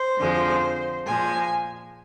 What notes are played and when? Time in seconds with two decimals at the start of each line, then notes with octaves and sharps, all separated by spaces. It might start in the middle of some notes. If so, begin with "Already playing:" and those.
Already playing: C5
0.18 F2 D3 F3 G#3
1.07 A#2 F3 G#3 G#5